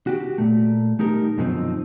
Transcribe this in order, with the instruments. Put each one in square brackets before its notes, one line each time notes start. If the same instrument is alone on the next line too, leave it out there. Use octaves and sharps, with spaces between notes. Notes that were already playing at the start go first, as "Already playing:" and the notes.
[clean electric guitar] F#4 G4
A#2 A3
A3 D#4 G4 A#4
F#2 B2 D3 F3 C4 D#4